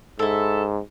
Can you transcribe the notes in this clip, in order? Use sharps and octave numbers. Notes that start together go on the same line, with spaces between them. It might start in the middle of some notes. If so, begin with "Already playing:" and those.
G#2 E4 A4